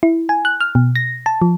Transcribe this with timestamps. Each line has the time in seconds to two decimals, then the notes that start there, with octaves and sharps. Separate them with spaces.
0.03 E4
0.29 G#5
0.45 F#6
0.61 F6
0.75 B2
0.96 A#6
1.26 A5
1.42 F3